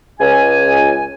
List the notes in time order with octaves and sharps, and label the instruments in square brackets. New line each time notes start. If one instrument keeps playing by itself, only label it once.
[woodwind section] C#2 G#5